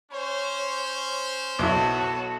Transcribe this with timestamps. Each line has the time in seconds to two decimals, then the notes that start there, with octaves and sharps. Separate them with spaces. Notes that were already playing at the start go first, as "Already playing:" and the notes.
0.11 C#4 C5 C#5
1.59 B1 B3 E4 F#4 A4 C#5